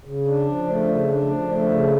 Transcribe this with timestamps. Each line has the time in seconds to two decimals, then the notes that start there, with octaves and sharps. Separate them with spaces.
0.05 C#3
0.26 D4
0.47 F3
0.68 A3
0.88 C#3
1.09 D4
1.29 F3
1.50 A3
1.70 C#3